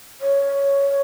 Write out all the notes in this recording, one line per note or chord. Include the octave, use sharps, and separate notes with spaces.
C#5